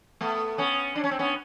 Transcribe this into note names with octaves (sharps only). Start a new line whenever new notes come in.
A3 B3
B3 C#4
D4
C#4
C4
B3 C#4